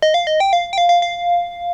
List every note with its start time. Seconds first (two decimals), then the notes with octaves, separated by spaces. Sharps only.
0.02 D#5
0.14 F5
0.27 D#5
0.40 G5
0.53 F5
0.73 G5
0.78 F5
0.89 F5
1.02 F5